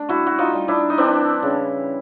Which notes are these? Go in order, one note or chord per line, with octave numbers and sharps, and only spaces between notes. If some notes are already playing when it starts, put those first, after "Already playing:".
Already playing: A3 D4
G3 E4 F#4
F#4
D#4 F4
G3
D4 E4
D#4
E3 C4 D4
C#3